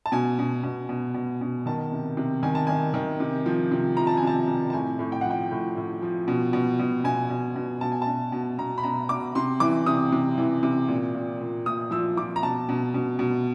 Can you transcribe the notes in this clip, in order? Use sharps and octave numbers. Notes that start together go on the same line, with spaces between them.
A5
B2 G#5
B2
B2
B2
B2
B2
D#3 A5
C3
C3
D#3 G#5
A5
D#3 G#5
D#3
C3
F3
C3
F3 A#5
A5
G#5
C3 A5
C3
A5
A2 G#5
A2
G5
F#5
F3 G5
A2
A2
F3
B2
B2
B2
B2 G#5
B2
B2
B2 A5
G#5
A5
B2
B2
B2 A#5
B5
B2 A#5
B2 D6
C3 C6
E3 D6
C3 D#6
C3
E3
C3
A#2
A#2
A#2
A#2 D#6
F3 E6
F3 D6
A#5
B2 A5
B2
B2
B2